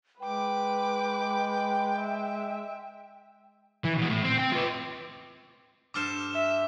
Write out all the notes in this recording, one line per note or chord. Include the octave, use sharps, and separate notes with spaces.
G#3 B4 G5 D6
E5
E3
B2 E3
A2
C4
C4 G5
F4 B4
G2 A4 C5 D6 F6 E7
E5